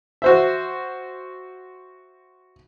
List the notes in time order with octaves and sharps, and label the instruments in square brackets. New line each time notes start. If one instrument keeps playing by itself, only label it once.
[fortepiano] F#4 C5 E5